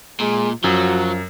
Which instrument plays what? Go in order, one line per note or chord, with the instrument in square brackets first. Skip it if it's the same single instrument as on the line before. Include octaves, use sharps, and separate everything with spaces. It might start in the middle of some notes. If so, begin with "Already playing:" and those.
[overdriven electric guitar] A#2 [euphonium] G#3
[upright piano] F#2 [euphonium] F3 [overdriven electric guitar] F#3 [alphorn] F#4